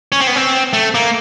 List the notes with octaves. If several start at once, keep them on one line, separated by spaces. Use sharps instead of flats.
C#4
C4
B3
C4
A3
A#3